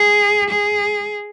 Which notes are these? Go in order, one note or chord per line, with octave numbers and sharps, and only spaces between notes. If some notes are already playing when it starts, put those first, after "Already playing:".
Already playing: G#4
G#4